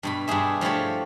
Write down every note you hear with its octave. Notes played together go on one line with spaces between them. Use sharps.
G2 B2 B5
G2 D4 G4 G#4 E5
F3 A3 E4 G4 C#5